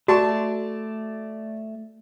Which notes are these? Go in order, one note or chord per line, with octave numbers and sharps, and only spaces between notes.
A3 F#4 D5 A5 C#6